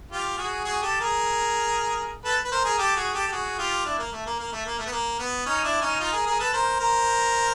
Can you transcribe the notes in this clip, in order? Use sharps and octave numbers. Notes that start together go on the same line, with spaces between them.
F4 G4
F#4 G#4
F#4 G#4
G4 A4
G#4 A#4
A4 B4
B4
A#4 C5
G#4 A#4
G4 A4
F#4 G#4
G4 A4
G4
F#4 G#4
F4 G4
D4 E4
A#3
A3
A#3
A#3
A3
A#3
A3
B3
A#3
B3
C#4 D#4
D4 E4
C#4 D#4
D#4 F4
G#4 A#4
G#4 A#4
A4 B4
A#4 C5
A#4 C5